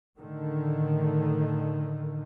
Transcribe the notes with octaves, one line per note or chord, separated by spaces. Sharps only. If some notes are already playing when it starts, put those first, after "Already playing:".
A2 D3 D#3